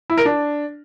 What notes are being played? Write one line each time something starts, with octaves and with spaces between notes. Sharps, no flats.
E4
A#4
D4